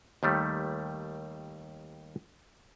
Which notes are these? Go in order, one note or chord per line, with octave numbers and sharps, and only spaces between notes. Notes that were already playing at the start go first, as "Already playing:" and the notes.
D#2 D#3 G3 A3